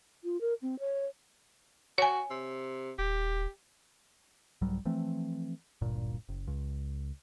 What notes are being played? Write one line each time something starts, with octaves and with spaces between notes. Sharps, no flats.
F4
A#4
C4
C#5
F#4 C#5 G#5
C3
D#1 G4
C2 G#2 F#3 G3
E3 F3 A3 C4
D1 G1 G2 A#2
F#1
C#2